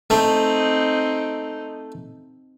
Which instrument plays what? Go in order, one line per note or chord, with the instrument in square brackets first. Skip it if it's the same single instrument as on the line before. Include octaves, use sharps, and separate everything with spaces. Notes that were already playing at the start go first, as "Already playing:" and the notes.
[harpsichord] A3 [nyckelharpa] C4 D#4